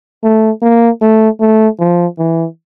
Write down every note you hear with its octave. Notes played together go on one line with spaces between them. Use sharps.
A3
A#3
A3
A3
F3
E3